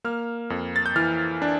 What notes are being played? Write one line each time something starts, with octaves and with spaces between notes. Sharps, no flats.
A#3 F6
F2
A6
G6
E3 F6
D4